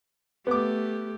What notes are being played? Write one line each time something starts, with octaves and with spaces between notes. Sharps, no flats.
A3 B3 G4 D6